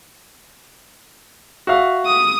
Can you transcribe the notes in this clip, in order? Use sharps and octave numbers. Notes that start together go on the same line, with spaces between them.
F#4 E5 F5
D#6